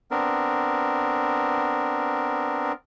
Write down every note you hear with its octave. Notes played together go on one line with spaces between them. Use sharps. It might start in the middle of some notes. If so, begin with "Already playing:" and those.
B3 C4 D4 A#4